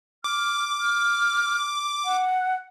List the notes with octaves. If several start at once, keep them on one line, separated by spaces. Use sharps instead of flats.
D6 F6
F6
F#5